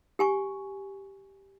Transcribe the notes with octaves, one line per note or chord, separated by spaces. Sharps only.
G4 G#5 C#6